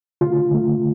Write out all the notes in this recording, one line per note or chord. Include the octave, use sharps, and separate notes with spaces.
D3 A3 F4
D3 A3